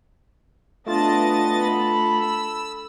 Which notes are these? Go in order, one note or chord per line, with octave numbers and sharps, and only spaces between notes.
A3 B3 D4 F4 D#5 A5 A6
A4 B5
E6